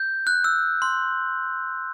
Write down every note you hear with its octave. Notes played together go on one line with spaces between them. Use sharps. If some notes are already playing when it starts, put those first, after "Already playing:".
Already playing: G6
F#6
E6
C6